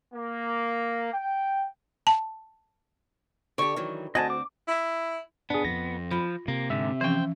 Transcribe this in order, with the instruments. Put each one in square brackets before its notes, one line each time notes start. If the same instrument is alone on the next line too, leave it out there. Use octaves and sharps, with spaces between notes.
[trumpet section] A#3
G5
[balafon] A5
[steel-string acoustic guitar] D3 G4 [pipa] D5 C#6
[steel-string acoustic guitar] D#3 E3 F#3
[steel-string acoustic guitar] D2 C4 [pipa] F#4 [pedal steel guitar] D#5 G#5 A5
[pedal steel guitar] D6
[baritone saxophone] E4
[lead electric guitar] B3 [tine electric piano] D4 G#4
[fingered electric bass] F2 [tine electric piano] A#6
[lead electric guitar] F3 [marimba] F4 B5
[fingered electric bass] C3 [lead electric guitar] A#3
[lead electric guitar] G#2 D3 [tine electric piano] E5
[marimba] E3 F3 C#4 [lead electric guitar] C5 G5